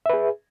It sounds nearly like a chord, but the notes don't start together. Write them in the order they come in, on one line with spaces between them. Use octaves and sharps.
E5 B4 G#4